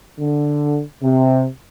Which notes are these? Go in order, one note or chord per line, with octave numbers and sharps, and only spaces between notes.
D3
C3